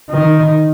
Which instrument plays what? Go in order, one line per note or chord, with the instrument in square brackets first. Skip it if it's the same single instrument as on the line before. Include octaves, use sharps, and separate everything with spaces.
[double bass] D#3